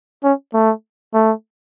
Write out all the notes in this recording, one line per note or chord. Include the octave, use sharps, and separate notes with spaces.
C#4
A3
A3